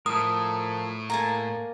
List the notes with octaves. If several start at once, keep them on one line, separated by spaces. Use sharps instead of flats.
A2 F3 A4 A#4 D#6
A#3 A4 G#5 A#5